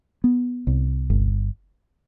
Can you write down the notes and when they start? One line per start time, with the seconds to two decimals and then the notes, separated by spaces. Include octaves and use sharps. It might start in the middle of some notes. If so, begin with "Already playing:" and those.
0.24 B3
0.67 C2
1.10 G1